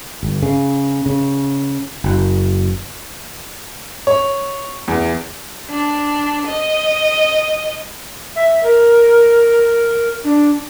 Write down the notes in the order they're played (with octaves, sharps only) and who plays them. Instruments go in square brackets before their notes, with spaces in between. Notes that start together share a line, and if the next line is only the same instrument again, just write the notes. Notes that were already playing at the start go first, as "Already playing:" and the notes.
[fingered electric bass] G1
C#3
C#3
F#1
[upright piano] C#5
E2
[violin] D4
D#5
[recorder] E5
A#4
D4